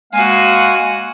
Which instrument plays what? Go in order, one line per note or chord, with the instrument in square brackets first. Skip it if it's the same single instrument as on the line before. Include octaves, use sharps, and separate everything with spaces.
[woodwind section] G#3 A#3 F5 [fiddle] F#4 G#5